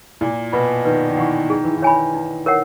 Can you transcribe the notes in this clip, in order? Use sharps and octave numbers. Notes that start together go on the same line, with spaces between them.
A#2 E4
B2 B4 F#5 B5
D#3 B4
D#3
E3 F#5 C#6
D#3 G#4
E3
D#3
C#5 G#5 B5
D#4
A#4 C#5 F#5